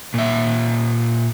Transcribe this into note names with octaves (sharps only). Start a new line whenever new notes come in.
A#2 E5